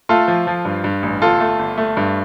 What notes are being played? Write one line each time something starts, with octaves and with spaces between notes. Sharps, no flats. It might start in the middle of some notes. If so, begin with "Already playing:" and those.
A3 F4 A4
F3
F3
G2
G2
A1
G1 F4 A4
A3
G1
A3
G2